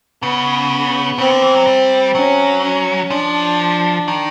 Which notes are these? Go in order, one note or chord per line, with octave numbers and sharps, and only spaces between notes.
C#3 B3
C#3 C4
D3
E3
F#3
G3
F#3 C#4
C#4
F3 D4
D#3